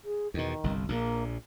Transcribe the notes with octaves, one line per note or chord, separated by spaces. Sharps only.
G#4
E2 B2 D#3
G1 C2
A#1 A#2 A#3